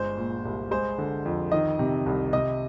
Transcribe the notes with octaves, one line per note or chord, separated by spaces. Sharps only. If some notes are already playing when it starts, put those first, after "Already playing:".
Already playing: G1 G#3 C5
A#2
C2
G#3 C5
D3
F2
D#3 D#5
C3
C2
C3 D#5